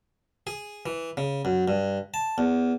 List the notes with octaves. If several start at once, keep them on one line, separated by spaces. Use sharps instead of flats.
G#4
E3
C#3
F#2
G2
A5
E2